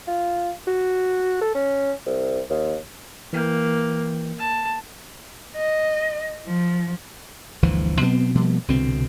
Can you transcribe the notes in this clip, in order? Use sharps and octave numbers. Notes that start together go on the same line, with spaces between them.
F4
F#4
A4
C#4
C2
D#2
E3 A#3 G5 G6
A5
D#5
F3
G1 D2 E3 F3
B2 F#3 B3 C4
B2 F3 G3 A#3
C2 B2 D3 C4